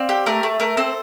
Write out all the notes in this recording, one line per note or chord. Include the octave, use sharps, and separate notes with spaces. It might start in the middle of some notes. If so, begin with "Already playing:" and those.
Already playing: C4 D5 F5
G4
A3 A#4
A3
A3 A#4
C4 A4 C5